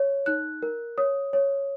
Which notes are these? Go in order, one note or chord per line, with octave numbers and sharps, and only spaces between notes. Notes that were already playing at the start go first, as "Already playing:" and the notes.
Already playing: C#5
D#4 F#6
A#4
C#5 D#6
C#5